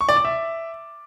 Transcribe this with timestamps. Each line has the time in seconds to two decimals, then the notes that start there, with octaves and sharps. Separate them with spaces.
0.01 C#6
0.09 D5
0.17 D6
0.25 E5